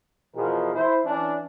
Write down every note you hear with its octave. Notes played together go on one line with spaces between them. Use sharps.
E2 B2 F3 G#4 A#4
E4 C5
E3 C#4 D4